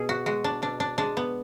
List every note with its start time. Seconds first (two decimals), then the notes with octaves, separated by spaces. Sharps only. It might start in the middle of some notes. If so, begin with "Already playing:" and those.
Already playing: B2 G#4
0.09 F#4
0.26 G#3 F#4
0.44 D4
0.62 B2 D4
0.80 D4
0.98 G#3 D4
1.17 B3